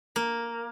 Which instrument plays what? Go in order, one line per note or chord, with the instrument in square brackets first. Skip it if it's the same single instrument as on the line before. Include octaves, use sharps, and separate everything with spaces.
[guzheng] A#3